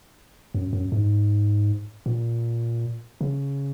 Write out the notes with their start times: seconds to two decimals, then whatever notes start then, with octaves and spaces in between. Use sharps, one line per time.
0.54 F#2
0.73 F#2
0.92 G#2
2.06 A#2
3.21 C#3